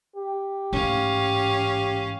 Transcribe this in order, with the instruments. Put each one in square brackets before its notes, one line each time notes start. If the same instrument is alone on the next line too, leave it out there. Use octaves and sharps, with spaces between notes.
[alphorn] G4
[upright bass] A1 G#2 [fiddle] C#4 F5